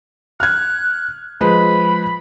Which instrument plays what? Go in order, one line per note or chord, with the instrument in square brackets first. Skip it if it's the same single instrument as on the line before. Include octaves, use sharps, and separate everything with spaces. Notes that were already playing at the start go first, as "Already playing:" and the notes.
[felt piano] F6 G#6 [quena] F#6
[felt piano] F3 G#3 B4 [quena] B5